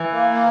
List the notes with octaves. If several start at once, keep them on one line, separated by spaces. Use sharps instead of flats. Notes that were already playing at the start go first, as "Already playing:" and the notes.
Already playing: E3
A#3
A#3